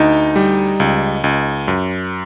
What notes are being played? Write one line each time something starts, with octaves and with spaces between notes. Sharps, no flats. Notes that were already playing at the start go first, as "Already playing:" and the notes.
Already playing: D2 D#4
G3
C#2
C#2
F#2